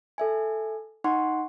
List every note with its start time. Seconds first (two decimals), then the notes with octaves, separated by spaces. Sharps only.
0.18 A4 E5 G#5
1.04 D#4 F#5 C6 C#6